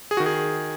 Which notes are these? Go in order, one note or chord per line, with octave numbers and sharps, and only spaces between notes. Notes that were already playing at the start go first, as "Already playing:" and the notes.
G#4
F#4
D#3
G#4